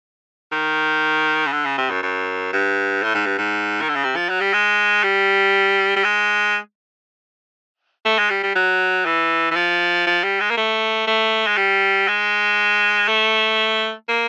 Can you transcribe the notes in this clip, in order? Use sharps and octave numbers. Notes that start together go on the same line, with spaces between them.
D#3
C#3
D3
C#3
C3
F#2
F#2
G2
A2
G#2
G2
G#2
D#3
D3
C#3
C3
F3
F#3
G3
G#3
G3
G3
G#3
A3
G#3
G3
G3
F#3
E3
E3
F3
F3
G3
G#3
A#3
A3
A3
G#3
G3
G#3
A3
A#3